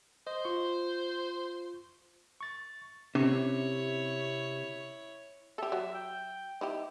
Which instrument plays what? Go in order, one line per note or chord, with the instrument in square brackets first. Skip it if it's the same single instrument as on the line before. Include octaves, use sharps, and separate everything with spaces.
[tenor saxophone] C5 [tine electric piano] D#5
[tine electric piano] F4 C#6
C#6 A6
[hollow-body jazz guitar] C3 [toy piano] C#4 [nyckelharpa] E4 C#5
[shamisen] G4 A4 [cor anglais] E5
[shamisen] F#3
[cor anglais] G5
[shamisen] D#4 E4 G4